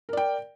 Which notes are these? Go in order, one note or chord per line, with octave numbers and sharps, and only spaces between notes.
A#4 D5 G5